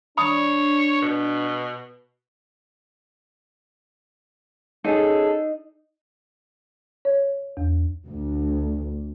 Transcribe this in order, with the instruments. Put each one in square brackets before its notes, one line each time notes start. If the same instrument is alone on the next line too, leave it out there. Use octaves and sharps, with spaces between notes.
[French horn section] D4 [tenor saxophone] C#5 [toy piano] B5 D#6
[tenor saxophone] B2
[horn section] C#4 G#4 A4 [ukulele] D#4
[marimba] C#5
E2
[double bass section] D2